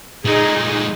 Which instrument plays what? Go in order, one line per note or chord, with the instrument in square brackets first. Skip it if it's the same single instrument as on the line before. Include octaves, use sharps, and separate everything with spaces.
[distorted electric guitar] A#2 G#3 [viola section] D#4 G#4